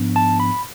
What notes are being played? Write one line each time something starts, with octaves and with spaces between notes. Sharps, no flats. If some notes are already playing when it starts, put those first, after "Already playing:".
Already playing: G#2 F3 B3 D4
A5
B5